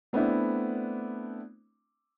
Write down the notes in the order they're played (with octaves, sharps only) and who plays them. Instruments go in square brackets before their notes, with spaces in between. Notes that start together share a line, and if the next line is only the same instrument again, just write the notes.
[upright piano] A3 B3 C4 D4 E4